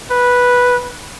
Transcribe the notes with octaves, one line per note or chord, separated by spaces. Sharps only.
B4